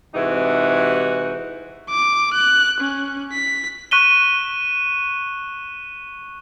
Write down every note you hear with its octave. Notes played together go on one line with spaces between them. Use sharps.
G#2 C3 E3 D#4 F#4
D6
F#6
C#4
B6
C#6 F#6 B6 D#7 E7 G7